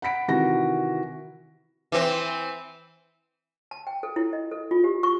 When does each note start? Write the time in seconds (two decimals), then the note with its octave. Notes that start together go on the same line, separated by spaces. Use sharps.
0.02 F#5 B5 B6 D7
0.28 C3 D#3 E3 F#4 F#5 A#6
1.92 E3 C4
3.71 A5
3.87 G5
4.03 A4
4.16 E4
4.33 D#5
4.51 A4
4.71 F4
4.84 G4
5.03 C#6